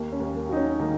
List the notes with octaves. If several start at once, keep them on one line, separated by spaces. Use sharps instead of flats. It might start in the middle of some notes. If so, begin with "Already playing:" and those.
Already playing: D#2 A#3
C#4
D#2
A#3
F#3 D#4
C#4
D#3 A#3